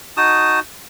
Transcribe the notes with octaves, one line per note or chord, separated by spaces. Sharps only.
D#4 F#4 A5 D#6